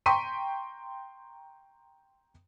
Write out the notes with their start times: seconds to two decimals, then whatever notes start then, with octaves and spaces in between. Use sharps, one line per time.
0.06 G5 A#5 C6 C#6 B6 D#7